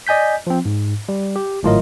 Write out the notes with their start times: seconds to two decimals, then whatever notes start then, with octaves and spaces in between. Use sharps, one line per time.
0.07 D5 D#5 G#5 G6 B6
0.47 F3 C4
0.65 G#2
1.09 G3
1.36 G4
1.63 G#1 A2 F#3 F4 A#4 D#5